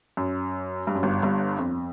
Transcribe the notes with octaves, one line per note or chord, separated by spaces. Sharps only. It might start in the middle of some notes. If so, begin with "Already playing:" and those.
F#2
G2
F#2
G1 G2
G1 G2
F2